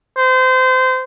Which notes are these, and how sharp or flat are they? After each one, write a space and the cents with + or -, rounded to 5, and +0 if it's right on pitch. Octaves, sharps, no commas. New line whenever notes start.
C5 -25